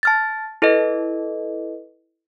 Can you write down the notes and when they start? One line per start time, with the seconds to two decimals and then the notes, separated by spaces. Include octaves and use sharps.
0.03 A5 F6 A6
0.62 E4 A4 B4 D#5